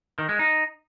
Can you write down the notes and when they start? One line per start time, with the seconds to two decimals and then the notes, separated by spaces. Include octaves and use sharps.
0.19 D#3
0.29 G#3
0.39 D#4